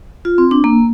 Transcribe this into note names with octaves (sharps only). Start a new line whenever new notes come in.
F4
C4
D4
A#3